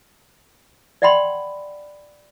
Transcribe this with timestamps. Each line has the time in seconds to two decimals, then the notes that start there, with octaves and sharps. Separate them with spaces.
1.02 D5 E5 F#5 G5 B5 C6